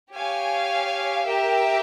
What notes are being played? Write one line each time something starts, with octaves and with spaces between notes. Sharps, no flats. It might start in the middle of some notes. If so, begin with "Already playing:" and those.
G4 C#5 F5 G#5
G4 A#4 E5 G5